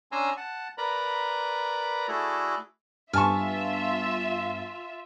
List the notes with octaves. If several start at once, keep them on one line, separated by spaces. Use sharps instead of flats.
C#4 D4 G#5 A#5 C6 E6
F#5 A5
A#4 B4 D5 A#5 B5
A3 E4 F#4 G#4 A4 D5
G2 B3 F4 E5 G#5 A5 C#6 F6